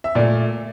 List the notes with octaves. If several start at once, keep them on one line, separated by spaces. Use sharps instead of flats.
E5
A#2 A3 D5